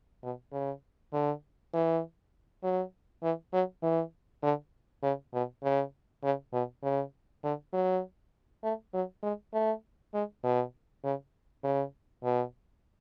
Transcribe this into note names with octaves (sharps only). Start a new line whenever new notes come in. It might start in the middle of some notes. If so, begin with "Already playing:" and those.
B2
C#3
D3
E3
F#3
E3
F#3
E3
D3
C#3
B2
C#3
C#3
B2
C#3
D3
F#3
A3
F#3
G#3
A3
G#3
B2
C#3
C#3
B2